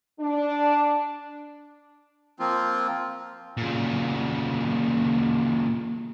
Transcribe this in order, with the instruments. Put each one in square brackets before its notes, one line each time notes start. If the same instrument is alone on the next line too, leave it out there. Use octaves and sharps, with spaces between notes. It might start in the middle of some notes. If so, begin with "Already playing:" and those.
[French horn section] D4
[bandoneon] F3 A#3 C4 F4
[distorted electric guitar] A#2 C#3